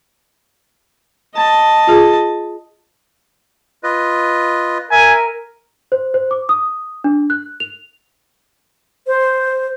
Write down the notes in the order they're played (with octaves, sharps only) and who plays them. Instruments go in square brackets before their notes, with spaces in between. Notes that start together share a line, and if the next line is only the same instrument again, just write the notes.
[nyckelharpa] D#5 A5
[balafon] F4 G#4
[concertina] F4 B4 D#5
[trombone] A#4 [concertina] E5 [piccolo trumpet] G#5
[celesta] C5
C5
D6
D#6
D4
F#6
F7
[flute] C5